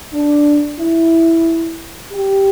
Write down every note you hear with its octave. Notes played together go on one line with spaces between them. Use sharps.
D4
E4
G4